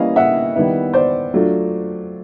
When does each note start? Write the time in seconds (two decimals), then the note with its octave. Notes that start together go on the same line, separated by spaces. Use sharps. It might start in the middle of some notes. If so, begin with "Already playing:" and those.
Already playing: E3 G3 A#3 C#4 D#5 F5
0.16 E5 F#5
0.55 D#3 G3 B3 E4
0.94 C5 D5
1.34 F#3 A3 D4 F4